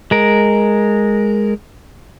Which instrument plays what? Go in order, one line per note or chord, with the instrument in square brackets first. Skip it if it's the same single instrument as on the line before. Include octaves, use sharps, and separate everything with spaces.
[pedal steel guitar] G#3 A#4